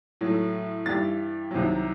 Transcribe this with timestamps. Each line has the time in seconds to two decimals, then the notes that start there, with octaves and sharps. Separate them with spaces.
0.21 A2 F#3 A3
0.86 G2 E3 G3 A6
1.51 C2 C3 D#3 F#3